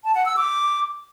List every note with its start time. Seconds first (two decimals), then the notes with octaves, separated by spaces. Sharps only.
0.04 A5
0.15 F#5
0.26 E6
0.37 D6